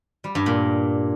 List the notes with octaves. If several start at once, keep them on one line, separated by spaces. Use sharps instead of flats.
G3
G2
A#2